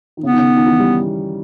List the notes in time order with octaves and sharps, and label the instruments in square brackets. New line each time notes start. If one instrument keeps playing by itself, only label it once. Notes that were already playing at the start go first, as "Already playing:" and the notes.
[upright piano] D#3
[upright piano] C#3 [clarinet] B3
[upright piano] D#3
C#3
D#3
E3
G3